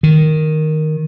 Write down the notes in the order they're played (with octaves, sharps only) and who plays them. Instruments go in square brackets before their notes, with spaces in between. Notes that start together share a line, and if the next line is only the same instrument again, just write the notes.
[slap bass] D#3